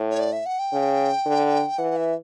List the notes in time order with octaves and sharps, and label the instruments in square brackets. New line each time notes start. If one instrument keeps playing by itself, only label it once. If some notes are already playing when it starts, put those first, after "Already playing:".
Already playing: [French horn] A2
[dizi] C#5
D5
E5
F#5
G5
[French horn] C#3
D3
[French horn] E3 [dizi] F#5
[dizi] E5